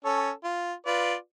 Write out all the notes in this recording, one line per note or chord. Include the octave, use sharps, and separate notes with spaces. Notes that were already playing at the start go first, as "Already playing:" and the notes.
C#4 A4 C#5
F4
F4 B4 D5